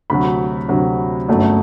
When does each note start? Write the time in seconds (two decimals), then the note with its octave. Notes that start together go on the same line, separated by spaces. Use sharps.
0.10 D2 C3 F#3 B5
0.68 D2 C3 F#3
1.28 G1 F#2 F#3 A3